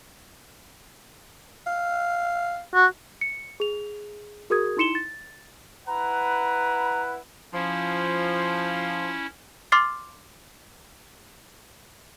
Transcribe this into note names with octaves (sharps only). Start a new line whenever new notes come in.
F5
F#4
C#7
G#4 F7
F#4 G#4 A#4 D#6 G#6
D#4 E4 C6 C#7 E7 G7
A6
E4 B4 F#5 A#5
F3 C#4 E4
C6 D6 F6 A6 C7